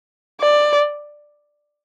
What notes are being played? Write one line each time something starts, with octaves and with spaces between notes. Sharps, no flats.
D5